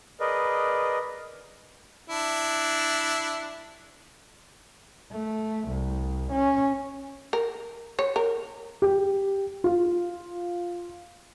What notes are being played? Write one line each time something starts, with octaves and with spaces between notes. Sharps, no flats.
G#4 A#4 B4 D5 D#5
D4 E4
A3
C2
C#4
A#4
C#5
A#4
G4
F4